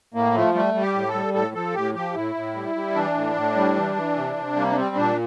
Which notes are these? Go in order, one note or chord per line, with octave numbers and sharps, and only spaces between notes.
A2 A#3
F3 A3
G3 A3
G3
G4
A2
A4
G3
A2 A4
F3 A4
A2 G4
F3 G4
A2 E4
A2
G3
G3
E3 D4
A2
A2
G3
E3
E3
C3
C3
G3 A#3
D4
G3 C4
A#2 D4